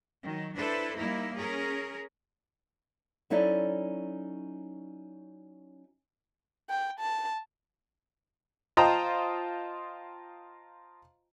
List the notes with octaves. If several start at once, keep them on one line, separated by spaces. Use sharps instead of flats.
D#3 F#3
D4 E4 A4 B4 C5
G3 A#3 D#4 E4
C#4 G#4 A#4
F#3 C#4 D#4 E4 A4 D5
G5
A5
F4 C5 D#5 G5 A5 A#5